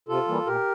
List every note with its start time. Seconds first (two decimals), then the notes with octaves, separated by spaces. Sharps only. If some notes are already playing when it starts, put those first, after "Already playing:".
0.09 C3 F4 A4
0.28 E3 G3 A#3
0.46 A#2 G4 A#4